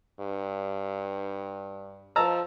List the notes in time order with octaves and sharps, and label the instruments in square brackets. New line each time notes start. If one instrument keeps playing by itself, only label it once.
[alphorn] G2
[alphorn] F3 [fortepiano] A5 A#5 E6